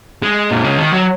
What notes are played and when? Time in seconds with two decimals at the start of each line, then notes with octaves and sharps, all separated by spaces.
0.22 G#3
0.50 A#2
0.64 C#3
0.78 D#3
0.92 F#3